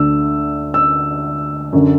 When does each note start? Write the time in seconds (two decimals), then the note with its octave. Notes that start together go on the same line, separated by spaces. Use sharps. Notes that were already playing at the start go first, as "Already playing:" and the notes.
Already playing: D2 D3 E6
0.74 E6
1.73 F#2 D3